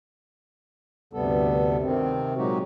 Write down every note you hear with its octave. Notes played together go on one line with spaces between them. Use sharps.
D2 G2 C3 G3 B3 A4
C3 D#3 C4
A#2 F#3 G#3 D#4 F#4 G4